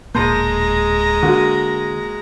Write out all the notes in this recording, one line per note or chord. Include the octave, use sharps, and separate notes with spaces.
D1 A#2 G#3 A#3 A5 A#5 C6 G6
D3 A#3 F#4